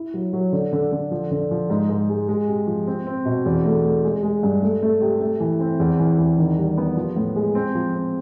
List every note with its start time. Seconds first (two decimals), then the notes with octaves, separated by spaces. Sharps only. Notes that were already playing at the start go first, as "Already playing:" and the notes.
Already playing: E4
0.14 F#3
0.33 F#3
0.52 D3
0.72 D3
0.92 D3
1.11 F3
1.31 D3
1.51 F3
1.70 G#2
1.89 G#2
2.09 G#3
2.28 G#3
2.48 C3
2.67 F3
2.87 C4
3.07 C4
3.25 B2
3.46 E2
3.65 A3
3.84 A3
4.04 G#3
4.23 G#3
4.43 G2
4.63 A3
4.82 A3
5.01 C3
5.21 A3
5.40 E3
5.60 C4
5.80 E2
5.99 E3
6.19 E2
6.38 D#3
6.58 G3
6.77 B3
6.97 F3
7.16 A2
7.36 G#3
7.55 C4
7.75 F3
7.95 C4